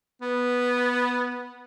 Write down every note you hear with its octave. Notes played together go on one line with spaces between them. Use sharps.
B3